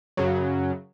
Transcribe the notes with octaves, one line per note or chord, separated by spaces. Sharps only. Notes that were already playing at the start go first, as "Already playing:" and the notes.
F#2 C#3 F#3